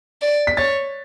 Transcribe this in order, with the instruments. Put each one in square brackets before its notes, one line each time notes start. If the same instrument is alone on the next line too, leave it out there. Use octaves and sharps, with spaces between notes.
[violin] D5
[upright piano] B6
[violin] C#5 [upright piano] A6